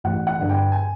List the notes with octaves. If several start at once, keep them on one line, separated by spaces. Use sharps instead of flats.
A1 F#5
F#5
G2 D3
G5
G#5